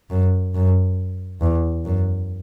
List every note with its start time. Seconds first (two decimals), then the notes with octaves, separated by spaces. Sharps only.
0.10 F#2
0.55 F#2
1.41 E2
1.85 F#2